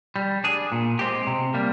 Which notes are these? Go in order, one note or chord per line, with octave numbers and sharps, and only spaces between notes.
G3
D4 G#4
A#2
G#3 C4 G4
C3
G3 A#3